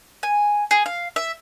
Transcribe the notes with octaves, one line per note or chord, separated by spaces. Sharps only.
G#5
G#4
F5
E5